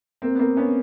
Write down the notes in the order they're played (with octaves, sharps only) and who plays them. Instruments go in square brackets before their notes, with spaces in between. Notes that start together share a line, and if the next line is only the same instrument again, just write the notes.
[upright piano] A#3 C4
B3
A#3 C4
B3 C#4